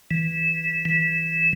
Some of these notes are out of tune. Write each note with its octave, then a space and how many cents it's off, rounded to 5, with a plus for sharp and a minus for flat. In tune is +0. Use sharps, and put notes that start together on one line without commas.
E3 -15
E3 -15